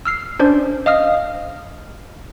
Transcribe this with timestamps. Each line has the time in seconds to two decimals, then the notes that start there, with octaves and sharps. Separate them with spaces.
0.05 E6 F6 C7
0.39 C#4 D4 C5 D5
0.86 D#5 F5 D#6 F6